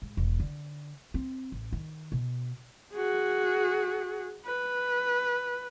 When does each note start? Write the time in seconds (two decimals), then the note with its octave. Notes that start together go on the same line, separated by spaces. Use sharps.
0.02 G#2
0.17 E1
0.40 D3
1.14 C4
1.52 A1
1.72 D#3
2.12 B2
2.93 F#4 G#4
4.45 B4